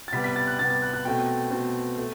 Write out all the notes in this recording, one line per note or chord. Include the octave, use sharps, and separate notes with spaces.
A6
C3 G3 B3 B6
B6
A6
F#6
C3 G3 B3 A6
A6
F#6
F#6
B2 A3 C4 G5
B2 A3 C4
A3